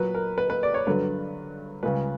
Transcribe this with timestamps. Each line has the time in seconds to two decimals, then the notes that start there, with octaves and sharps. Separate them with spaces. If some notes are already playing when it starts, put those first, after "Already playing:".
Already playing: A#2 F#3 B4
0.14 A#4
0.38 B4
0.50 B4
0.63 D5
0.74 C#5
0.87 G2 D3 F#3 B4
1.83 C#2 C#3 G3 B4